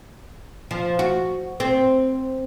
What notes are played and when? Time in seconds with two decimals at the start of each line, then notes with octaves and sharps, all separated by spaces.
0.71 F3
0.99 F#4
1.60 C4